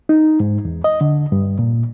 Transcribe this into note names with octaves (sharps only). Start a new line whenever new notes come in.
D#4
G#2
E2
D#5
D3
G2
A#2